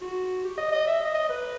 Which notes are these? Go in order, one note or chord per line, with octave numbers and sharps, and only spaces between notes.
F#4
G4
D#5
D#5
E5
D#5
D#5
B4